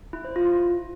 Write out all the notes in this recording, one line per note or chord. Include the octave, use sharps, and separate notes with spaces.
E4
C5
F4